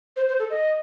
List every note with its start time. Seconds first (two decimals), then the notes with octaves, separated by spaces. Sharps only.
0.16 C5
0.28 C5
0.39 A4
0.50 D#5